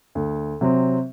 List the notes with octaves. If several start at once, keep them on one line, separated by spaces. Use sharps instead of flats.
D2
C3 F#3 C4